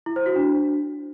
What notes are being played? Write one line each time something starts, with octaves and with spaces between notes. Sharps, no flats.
E4
C5
F#4
D4